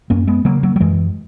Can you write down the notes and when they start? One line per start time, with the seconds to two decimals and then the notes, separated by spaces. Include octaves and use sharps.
0.10 F#2 A#3 C#4
0.27 G#3 B3
0.45 C#3 F#3 A#3
0.63 F#3 A#3
0.76 F#3
0.80 F#2 E3 G#3